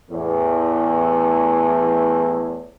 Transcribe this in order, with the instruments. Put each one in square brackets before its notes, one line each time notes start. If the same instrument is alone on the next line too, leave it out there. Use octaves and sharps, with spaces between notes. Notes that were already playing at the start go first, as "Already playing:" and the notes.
[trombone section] E2 A2